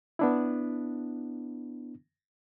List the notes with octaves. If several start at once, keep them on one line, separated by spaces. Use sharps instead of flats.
B3 D4 E4